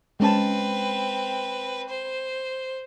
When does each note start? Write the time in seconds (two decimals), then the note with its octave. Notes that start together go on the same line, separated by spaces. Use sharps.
0.20 G#3 C4 C#4 B4 A5
1.89 C5